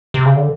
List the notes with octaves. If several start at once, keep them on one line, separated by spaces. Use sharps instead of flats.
C3
C#3
D3